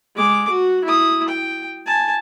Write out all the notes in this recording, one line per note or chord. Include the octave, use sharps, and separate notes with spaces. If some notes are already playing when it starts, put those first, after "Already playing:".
G#3 D6
F#4
E4 D#6
G5
G#5 A5